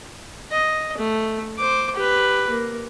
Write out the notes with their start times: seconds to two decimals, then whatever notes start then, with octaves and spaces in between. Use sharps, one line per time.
0.51 D#5
0.97 A3
1.58 C5 D6
1.96 G4 B4
2.50 A#3